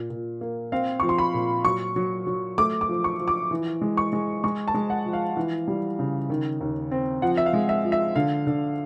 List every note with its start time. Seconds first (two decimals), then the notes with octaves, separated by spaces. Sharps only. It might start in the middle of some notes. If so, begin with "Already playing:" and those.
Already playing: A#2
0.10 A#2
0.41 A#3
0.72 C4 F5
1.00 F3 C#6
1.09 C6
1.18 B5
1.34 A#2
1.65 F#3 C#6
1.96 F#3
2.27 F#3
2.58 A3 D6
2.81 D6
2.89 F3
3.04 C#6
3.20 F3
3.28 D6
3.51 E3
3.82 G#3
3.97 C#6
4.13 G#3
4.44 G#3 C#6
4.68 A5
4.74 G#3
4.90 F#5
5.06 F3
5.13 F5
5.37 E3
5.68 G3
5.99 C#3
6.30 D#3
6.61 D#2
6.91 C4
7.22 F3 F#5
7.37 E5
7.46 F5
7.53 G#3
7.69 E5
7.85 F3
7.92 E5
8.16 D3 F5
8.47 D3